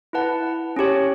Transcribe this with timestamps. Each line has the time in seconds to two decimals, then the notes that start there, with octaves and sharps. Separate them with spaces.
0.13 E4 B4 F#5 A5
0.76 C#4 G4 C#5